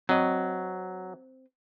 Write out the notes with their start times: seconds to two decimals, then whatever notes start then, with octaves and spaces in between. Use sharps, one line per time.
0.09 F#3 C4 D#5